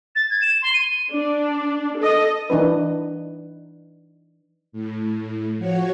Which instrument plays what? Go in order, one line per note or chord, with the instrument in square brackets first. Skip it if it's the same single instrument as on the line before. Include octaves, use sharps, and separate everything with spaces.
[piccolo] A6
G#6
E7
C6
D#7
[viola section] D4
A4 D#5
[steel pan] E3 D4 D#4 B4
[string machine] A2
A2
F3 F#4 C#5